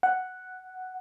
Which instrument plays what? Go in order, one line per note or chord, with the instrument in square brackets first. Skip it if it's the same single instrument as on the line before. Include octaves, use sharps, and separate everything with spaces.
[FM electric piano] F#5